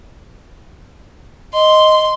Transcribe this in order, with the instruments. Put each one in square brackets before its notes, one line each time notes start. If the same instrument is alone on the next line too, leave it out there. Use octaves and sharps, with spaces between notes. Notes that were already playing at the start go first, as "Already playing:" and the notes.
[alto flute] D#5 [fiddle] C6